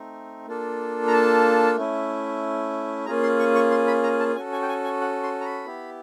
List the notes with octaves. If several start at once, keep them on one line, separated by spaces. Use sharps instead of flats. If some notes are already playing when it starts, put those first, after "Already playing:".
Already playing: A3 C4 D#4
A#3 D4 F4 A4
A#5
A5
A3 C#4 E4
A#3 C#4 F4 G#4 A#5
C6
C#6
C#6
C6
B5
A#5
A5
C#4 F#4 A4 G#5
G#5
G5
G#5
G#5
F#5
C6
A#5
B5
B3 E4 G4